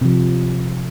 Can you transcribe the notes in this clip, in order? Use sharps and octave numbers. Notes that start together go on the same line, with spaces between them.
C3 F3